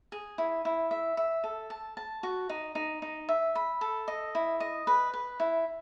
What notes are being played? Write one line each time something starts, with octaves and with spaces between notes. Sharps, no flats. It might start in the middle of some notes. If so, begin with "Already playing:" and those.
G#4
E4
E4
E5
E5
A4
A5
A5
F#4
D#4
D#4
D#4
E5
B5
A4
D#5
E4
D#5
B4
B4
E4